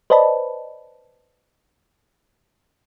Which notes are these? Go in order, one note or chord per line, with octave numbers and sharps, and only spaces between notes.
B4 C5 D5 D#5 A5 B5